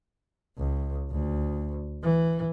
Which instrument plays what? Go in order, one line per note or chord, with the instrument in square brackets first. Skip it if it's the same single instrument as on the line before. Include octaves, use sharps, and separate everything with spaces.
[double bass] C#2
D2
E3